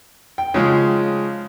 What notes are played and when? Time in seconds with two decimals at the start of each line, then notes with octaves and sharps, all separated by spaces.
0.38 G5
0.54 C#3 F3 G#3